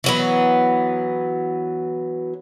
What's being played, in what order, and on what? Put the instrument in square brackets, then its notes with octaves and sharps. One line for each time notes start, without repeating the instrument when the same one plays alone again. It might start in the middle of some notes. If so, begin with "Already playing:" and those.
[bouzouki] E3 F#3 B3